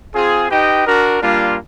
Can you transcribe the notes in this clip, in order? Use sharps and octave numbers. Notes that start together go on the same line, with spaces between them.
C4 F4 G#4
D#4 G4 B4 D#5 G5
D4 F#4 A#4
G3 A#3 D4 F4